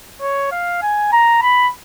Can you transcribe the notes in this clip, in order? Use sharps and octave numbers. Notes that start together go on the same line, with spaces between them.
C#5
F5
G#5
A#5
B5